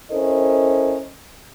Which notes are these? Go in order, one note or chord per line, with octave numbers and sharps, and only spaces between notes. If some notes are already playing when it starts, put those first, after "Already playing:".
C#4 E4 A4 A#4 C5 D#5